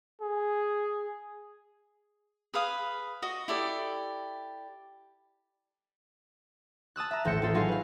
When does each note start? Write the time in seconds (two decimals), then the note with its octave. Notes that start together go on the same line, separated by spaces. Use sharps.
0.21 G#4
2.54 G#4 B4 F5 D#6
3.22 F#4 D#5
3.48 E4 G4 A4 D5
6.96 A5 D#6 E6 F#6
7.11 E5 A#5
7.25 D#1 A1 E5 G6 A#6 C#7
7.42 A1 F4 A4
7.54 F#3 D#4 F4 G#4 F5
7.68 B4 F5